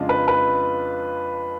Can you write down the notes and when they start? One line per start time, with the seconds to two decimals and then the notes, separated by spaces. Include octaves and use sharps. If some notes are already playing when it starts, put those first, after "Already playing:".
Already playing: F2 C#3 G#3 D4 F4
0.09 B4
0.28 B4